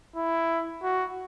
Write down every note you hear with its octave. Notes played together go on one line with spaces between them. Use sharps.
E4
F#4